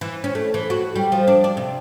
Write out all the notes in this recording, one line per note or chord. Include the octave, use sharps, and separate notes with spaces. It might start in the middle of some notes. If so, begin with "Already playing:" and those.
E3
C#4
A3
E3
F#4
G3
F3
D4
D5
C3